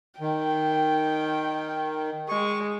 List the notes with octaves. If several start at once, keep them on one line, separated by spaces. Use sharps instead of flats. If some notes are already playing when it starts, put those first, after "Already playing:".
D#3 G5
G#3 C#6